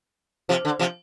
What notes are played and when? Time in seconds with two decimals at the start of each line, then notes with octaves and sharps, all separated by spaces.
0.49 C3 F3
0.65 D3
0.79 C3 F3